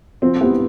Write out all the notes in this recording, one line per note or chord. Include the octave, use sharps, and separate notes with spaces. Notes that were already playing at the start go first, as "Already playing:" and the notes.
F3 C4
B3 E4 G4 C5